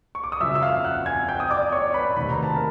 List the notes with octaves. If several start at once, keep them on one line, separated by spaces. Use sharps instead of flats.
C#6
D6
D#6
F#2 C#3 F3 E5 E6
E6
F5 F6
F#5 F#6
G#5 G#6
G5 G6
D#6
D5 D6
C#5 C#6
B4 B5
D2 C3 D#3 B5
A#5
A5
A#4